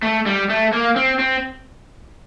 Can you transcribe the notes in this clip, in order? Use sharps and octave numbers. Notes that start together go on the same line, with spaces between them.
A3
G3
A3
A#3
C4
C4